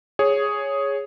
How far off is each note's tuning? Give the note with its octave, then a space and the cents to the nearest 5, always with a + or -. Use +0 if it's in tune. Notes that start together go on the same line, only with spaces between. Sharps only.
G#4 +0 C#5 +0